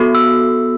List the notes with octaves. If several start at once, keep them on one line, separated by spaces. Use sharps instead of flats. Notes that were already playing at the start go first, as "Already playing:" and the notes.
Already playing: B3 F#4 A4
E6